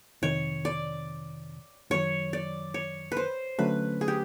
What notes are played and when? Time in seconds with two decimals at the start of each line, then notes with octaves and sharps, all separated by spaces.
0.22 F2 C3 D#3 C#5
0.65 D5
1.90 F#2 D#3 F#3 C#5
2.33 D5
2.74 C#5
3.12 B4
3.17 C5
3.59 D3 F#3 A3 C#4 B4
4.01 G#4
4.08 G4